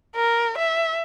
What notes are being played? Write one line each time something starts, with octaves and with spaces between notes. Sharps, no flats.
A#4
E5